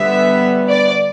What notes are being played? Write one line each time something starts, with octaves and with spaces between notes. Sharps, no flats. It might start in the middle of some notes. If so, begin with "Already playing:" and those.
Already playing: D3 G3 B3 E5
D5